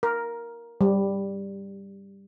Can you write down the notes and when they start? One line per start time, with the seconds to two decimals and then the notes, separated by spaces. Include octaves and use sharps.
0.03 A#4
0.81 G3